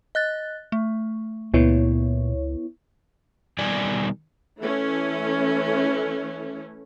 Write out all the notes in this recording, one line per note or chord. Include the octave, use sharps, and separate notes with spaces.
D#5 F#6 A6
A3
C#2 A#2 B3 E4 C#5
B2 D#3 G3 D5 G#5
E3 A3 C#4